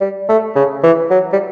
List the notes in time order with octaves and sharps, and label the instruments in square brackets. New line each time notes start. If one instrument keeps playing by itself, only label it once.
[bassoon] G3
A3
C#3
E3
F#3
G3